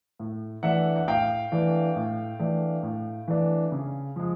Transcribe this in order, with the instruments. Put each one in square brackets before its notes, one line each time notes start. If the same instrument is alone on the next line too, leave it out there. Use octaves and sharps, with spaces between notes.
[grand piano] A2
E3 A3 D4 E5 F#5
F#5
A2 F5 G5
E3 A3 D4
A2
E3 A3 D4
A2
E3 A3 D4
C#3
F3 G#3